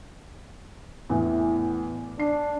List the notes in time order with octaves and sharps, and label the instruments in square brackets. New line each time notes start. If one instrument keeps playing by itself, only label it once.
[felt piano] E2 A2 E3
[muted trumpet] D4 [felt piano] C7